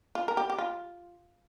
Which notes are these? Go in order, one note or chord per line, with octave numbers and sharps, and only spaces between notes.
F4
A#4
G4
G4
F4